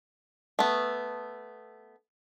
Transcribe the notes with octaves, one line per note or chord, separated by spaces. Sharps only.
A3 B3